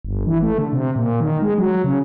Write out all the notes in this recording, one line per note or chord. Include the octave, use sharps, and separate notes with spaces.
G1
E3
A3
D3
C3
A#2
D#3
G#3
F#3
C#3